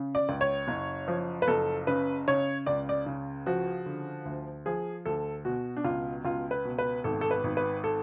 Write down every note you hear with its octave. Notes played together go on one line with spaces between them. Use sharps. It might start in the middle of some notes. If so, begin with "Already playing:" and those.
Already playing: C#3
D5
C#2
C#5
F#1
F3
B4
F#1 A4
C#3 B4
C#3 C#5
C#2 D5
D5
C#3
F3 F#4
D3
D2
F3 G#4
D2 A4
B2 F#4
D4
C#2 F4
C#2 F4
B4
B2
B4
G#1 A4
A4
B4
G#1
B4
A4